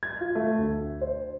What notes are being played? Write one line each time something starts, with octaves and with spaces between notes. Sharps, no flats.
G#6
F4
A3
D2
C5